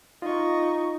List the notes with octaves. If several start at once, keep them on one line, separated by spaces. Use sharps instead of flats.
D#4 F4 D#5 C#6